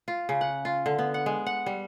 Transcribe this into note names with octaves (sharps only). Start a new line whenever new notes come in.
F4
C#3
F#5
F4
D3
B3
F#5
G#3
F#5
G3